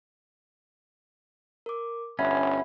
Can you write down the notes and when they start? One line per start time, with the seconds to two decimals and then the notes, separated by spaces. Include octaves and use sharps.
1.66 A#4 D6
2.19 G1 C#4 E5 F#5 B5